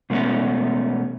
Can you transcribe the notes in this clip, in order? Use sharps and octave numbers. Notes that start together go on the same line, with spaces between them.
B2 G#3 A3 B3 C#4